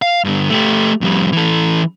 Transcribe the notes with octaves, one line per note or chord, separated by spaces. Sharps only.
F5
G2 D3
A3 G4
F2 G3
E3 A4